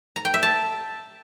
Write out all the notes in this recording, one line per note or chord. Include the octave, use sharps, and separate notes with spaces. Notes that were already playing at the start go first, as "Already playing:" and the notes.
A#5
G5
E5
A5